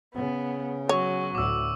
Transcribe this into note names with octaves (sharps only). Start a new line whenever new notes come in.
C#3 B3
F#3 C#5 C#6
D2 A2 D6 E6